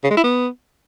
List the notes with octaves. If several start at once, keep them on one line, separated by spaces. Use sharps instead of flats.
C#3
G#3
E4
B3